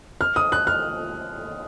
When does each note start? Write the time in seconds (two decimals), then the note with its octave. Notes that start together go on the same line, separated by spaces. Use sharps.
0.21 F6
0.36 D#6
0.52 F#6
0.67 F6